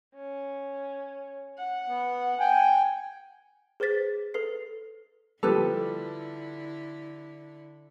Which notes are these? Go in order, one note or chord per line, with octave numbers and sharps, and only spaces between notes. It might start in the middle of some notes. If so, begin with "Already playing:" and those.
C#4
F#5
B3
G5 G#5
G#4 B4 C5 A6 B6
A4 B4 C7
D3 F3 G3 E4 A4 B4